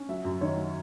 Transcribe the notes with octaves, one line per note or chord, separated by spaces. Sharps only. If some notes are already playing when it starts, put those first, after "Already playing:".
Already playing: C#4
F#3 E5
F#2
D#3 C#5
F#3